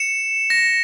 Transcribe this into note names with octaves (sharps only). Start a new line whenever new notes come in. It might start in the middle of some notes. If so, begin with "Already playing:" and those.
Already playing: C#7 E7
A#6